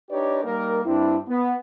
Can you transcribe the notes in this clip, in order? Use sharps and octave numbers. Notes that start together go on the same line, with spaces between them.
D4 D#4 G4 B4 C#5 D5
G3 A#3 D#4 A#4
G2 C4 D4 E4
B3